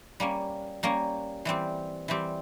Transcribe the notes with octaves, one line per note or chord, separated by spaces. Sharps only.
G3 A#3 C#4
G3 A#3 C#4
E3 G3 C4 G4
E3 G3 C4 G4